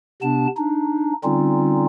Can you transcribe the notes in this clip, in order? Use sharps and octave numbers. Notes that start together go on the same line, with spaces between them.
C3 B3 D4 A5
D4 D#4
D3 G3 C4 C#4 D#4 F4